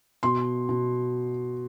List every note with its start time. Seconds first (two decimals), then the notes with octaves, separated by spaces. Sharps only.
0.23 B2 C6
0.69 B2